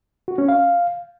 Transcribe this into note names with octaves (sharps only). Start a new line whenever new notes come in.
F#4
C#4
F5